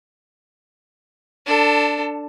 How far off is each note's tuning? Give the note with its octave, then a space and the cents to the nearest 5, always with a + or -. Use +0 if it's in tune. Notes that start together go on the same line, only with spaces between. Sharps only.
D4 +0 A4 +25